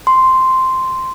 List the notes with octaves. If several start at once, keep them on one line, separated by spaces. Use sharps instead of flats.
C6